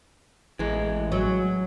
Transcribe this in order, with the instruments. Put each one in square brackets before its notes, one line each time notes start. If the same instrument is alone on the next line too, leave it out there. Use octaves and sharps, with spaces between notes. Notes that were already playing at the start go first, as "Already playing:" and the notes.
[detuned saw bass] A1 [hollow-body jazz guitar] E3 G#3
[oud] F#3